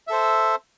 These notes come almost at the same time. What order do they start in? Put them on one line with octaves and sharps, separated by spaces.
E5 A4 C5